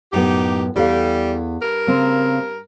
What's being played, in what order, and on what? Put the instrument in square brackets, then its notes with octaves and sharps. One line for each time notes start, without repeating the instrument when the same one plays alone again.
[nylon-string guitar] F#2 A2 B3 [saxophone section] D#4 G4
[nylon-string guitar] E2 A4 F5 [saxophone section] G3
[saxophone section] G2 A#4
[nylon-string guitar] C#3 A#3 C4